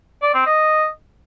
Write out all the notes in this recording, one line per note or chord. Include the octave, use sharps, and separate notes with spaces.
D5
C4
D#5